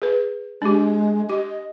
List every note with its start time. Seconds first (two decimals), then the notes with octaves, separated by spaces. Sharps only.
0.02 G#4 B4
0.62 G#3 D4 G4
1.30 G4 D#5